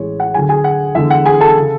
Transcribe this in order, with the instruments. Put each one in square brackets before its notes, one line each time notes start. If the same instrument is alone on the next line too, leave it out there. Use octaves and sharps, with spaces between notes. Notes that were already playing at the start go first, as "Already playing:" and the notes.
Already playing: [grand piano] A1 A2 G#3 C#5
F#5
D2 D3 F#3 G#4 G#5
G#4 G#5
F#5
E2 D3 G#3 E5
F#5
G#4 G#5
A4 A5
C#3